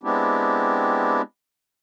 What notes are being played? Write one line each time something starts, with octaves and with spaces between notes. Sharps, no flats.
G#3 B3 C4 D4 E4 G4